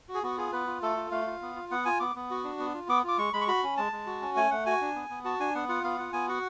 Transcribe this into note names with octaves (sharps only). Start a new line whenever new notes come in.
F#4
G#4
B3 F#4
F4 G#4
B3 B4
F4
A3 A4
F4
A3 F5
F4
B3
F4
B3 F#5
F4 G#5
B3 D6
B3
F#4
D4
B3
F4
B3 D6
F4 D6
G#3 C#6
G#3 B5
C#6
F#4 B5
C#4
G#3 A5
G#3
F#4
C#4
A3 G#5
A3 F#5
F#4 G#5
D4
B3
B3
F#4 A5
D4 G#5
B3 F#5
F4 F#5
B3 F5
F4 F#5
B3 G#5
F#4 F#5